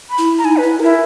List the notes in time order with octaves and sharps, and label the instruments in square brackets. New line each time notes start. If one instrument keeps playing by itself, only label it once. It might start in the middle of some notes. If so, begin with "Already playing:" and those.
[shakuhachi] B5
[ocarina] E4
[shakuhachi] A#5
[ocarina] D#4 [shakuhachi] G#5
[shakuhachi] B4
[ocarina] E4
[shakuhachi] E4 [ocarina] A#4